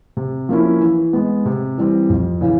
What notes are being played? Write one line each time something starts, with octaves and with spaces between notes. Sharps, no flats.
C3
F3 A#3 C#4 E4
E3
G#3 B3
C3
E3 G3 C4
F2
C#3 E3